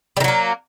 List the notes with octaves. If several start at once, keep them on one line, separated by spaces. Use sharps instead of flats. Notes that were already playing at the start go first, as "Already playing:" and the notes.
D#3 F#3 G3 A#3